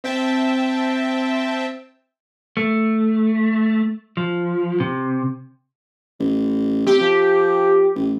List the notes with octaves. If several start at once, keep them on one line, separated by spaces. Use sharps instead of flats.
C4 E5 G5 A5
A3
F3
C3
A1
C3 G4
F3
A1